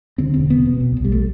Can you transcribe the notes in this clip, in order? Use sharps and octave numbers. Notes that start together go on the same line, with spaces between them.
D3 C4
E1 C4
B2 B3
B2
B1
B1
G3
A3